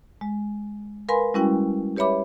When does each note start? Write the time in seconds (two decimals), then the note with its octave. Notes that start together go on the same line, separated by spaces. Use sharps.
0.21 G#3
1.09 A#4 B4 F5 G#5 B5 C6
1.34 G3 G#3 C#4 E4 F#4 G5
1.96 G4 B4 C#5 E5 B5 D6